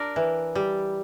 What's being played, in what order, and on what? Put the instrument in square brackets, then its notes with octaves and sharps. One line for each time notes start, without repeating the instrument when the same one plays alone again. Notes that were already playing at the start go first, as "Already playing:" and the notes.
Already playing: [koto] D4 A#4 D5
E3
G3